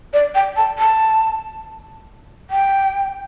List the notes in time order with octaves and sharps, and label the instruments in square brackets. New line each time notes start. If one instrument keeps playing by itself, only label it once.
[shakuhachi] D5
G5
A5
A5
G5